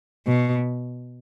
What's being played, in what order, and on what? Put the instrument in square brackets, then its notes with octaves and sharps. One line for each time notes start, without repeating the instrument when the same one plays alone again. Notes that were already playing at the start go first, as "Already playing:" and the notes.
[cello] B2